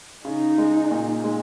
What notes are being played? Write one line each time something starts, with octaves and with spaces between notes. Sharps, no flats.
C#3 D#4
G#3
A#2
G#3